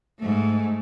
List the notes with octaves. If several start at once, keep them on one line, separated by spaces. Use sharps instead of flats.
G#2 A3